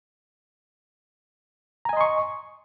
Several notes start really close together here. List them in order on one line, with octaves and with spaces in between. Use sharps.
A#5 G#5 D#5 C6 C#6